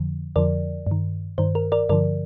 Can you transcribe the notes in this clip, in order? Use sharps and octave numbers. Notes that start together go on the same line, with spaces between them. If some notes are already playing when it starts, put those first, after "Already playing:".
Already playing: F2 D3 F3
F2 D3 F3 A#4 D5
G2 D#3
G2 D#3 C5
A#4
A#4 D5
G2 D3 F3 A#4 D5